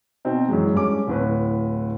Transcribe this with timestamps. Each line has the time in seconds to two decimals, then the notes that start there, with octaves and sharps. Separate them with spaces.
0.25 B2 C4 D#4
0.49 F#2 E3 G#3
0.74 G2 G#3 C#4 D6
1.07 D1 A2 B4